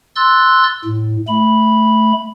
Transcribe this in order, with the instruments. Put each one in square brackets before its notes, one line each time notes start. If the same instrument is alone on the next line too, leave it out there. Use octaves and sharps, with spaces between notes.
[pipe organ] C6 E6 F#6 A6
A2
A3 B5